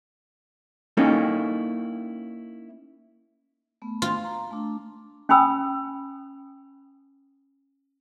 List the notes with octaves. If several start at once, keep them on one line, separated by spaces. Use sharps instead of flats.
A#3 C#4 D#4 E4 A4
A3 B3
F4
A#5
A3 D4
C#4 G5 G#5 B5 D#6 E6